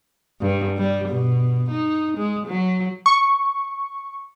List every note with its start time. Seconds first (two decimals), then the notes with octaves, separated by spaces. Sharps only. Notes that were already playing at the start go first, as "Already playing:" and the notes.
0.41 G2
0.78 G3
1.09 B2
1.71 D#4
2.17 G#3
2.47 F#3
3.06 C#6